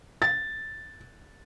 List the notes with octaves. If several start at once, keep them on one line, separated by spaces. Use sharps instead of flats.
A6